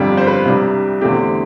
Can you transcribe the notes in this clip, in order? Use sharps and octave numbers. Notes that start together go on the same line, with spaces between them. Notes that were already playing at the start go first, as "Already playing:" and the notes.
Already playing: G1 F2 D3 G3 G4
C5
B4
C2 C3 G3 D4
E2 D3 A3 C4 G4